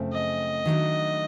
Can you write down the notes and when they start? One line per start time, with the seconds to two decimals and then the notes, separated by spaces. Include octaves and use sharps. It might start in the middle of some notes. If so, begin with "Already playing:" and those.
Already playing: F#2 C#3 F3 A3 C4
0.13 D#5
0.65 D#3 F#3 A3 D4